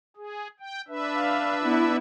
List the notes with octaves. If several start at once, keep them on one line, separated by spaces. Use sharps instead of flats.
G#4
G5
D4 B4 E5
F5
B3 E4